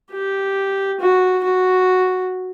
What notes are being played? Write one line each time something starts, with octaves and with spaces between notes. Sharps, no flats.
G4
F#4
F#4